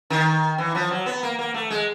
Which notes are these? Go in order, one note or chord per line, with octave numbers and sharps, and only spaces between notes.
D#3
E3
F3
F#3
B3
A#3
A#3
A3
G#3